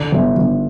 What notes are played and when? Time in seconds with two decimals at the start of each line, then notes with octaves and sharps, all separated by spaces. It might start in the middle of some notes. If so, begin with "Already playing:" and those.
Already playing: D3
0.12 G1
0.36 G1